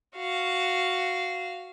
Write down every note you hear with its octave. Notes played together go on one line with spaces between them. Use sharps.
F#4 F5